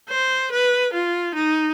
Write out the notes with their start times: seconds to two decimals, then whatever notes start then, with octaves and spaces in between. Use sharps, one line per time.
0.09 C5
0.52 B4
0.93 F4
1.35 D#4